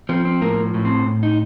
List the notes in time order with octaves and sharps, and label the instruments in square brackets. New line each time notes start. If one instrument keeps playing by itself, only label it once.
[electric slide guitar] F3 C4
C4
A2 A#3
A2
C4
A2
D#4